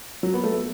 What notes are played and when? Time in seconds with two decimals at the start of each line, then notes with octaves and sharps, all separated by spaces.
0.23 F#3
0.34 B3
0.44 A3